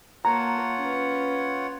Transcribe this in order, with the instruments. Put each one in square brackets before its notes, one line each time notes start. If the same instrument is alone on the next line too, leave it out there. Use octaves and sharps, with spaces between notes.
[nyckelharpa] A#3 A5 [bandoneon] F4 C#5 F#5 [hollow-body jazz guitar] A#5
[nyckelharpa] C#4 B4